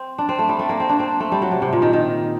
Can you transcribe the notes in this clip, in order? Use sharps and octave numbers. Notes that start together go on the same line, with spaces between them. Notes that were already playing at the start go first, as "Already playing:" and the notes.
Already playing: C4
D4
C4
A3
G3
A3
A#3
C4
D4
C4
A3
G3
F#3
C3
C3
A#2
D#3
D#3